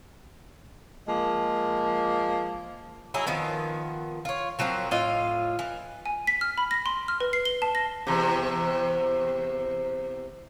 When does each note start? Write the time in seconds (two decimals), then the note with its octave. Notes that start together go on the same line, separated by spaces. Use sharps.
1.08 F3 G#3 A#3
3.14 F#3 D#4 E4 G#4
3.27 D#3 F3 B3
4.25 F4 C#5
4.59 F3 F#3 A#3 C4
4.91 A2 F4 D#5 F5
5.59 E3
6.06 G#5
6.27 B6
6.41 F6
6.58 B5
6.71 A#6
6.86 C6
7.08 F6
7.20 B4
7.33 C7
7.45 G7
7.62 A5
7.75 A#6
8.07 E2 C3